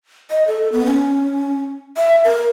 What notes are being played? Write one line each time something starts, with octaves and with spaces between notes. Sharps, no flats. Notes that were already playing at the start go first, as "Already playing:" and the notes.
D#5
A4
B3
C#4
E5
A#4